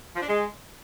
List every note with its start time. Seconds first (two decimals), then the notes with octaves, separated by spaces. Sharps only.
0.16 F3
0.22 D4
0.28 G#3